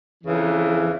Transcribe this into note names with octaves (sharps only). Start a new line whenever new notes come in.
F2 C#3 E3